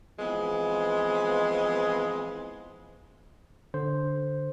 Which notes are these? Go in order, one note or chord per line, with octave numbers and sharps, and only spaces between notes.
E3 F3 G#3 B3 C4
D3 C5